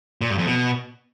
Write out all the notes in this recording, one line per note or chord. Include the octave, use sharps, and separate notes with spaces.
A#2
G2
F2
B2